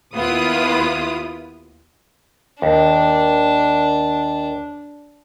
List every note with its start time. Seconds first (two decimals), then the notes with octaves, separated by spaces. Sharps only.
0.15 D#2 B3 E4 F4 D#6
2.62 D#2 D4